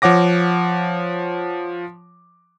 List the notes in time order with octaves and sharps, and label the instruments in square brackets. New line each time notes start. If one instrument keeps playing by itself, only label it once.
[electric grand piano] F3 C#5 F#5 D6 A#6